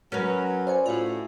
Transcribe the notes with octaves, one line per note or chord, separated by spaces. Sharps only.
F#3 C#4 A#4 B4
C5 D5 G#5
A2 F4 F#4